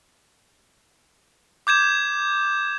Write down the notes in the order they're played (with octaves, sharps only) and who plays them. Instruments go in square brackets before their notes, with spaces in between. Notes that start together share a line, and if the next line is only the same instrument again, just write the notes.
[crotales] D6 G6 G#6 E7